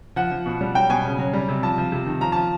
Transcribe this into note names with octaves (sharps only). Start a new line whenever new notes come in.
F3 F#5
F3
B2
G3
F#3 G5
B2 G#5
C#3
F#3
G3
C3
F3 A5
F3
C3
D#3
F3 A#5
F3 A5